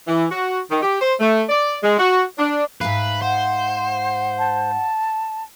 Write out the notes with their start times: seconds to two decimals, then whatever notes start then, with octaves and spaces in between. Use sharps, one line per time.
0.07 E3
0.30 F#4
0.70 D#3
0.82 G4
1.00 C5
1.19 A3
1.49 D5
1.82 G#3
1.98 F#4
2.37 D4
2.81 G#2 B4 E5 F5
3.22 C5 F#5
4.38 A5